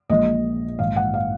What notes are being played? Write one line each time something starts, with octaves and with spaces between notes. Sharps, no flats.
A#1 A#2 G#3 D#5
A#1 G#2 D#3 F5
F#5
F5